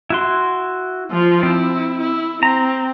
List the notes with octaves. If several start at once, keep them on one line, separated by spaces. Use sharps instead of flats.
E4 F#4 C6
F3 F4
C4 E4
E4
C4 A#5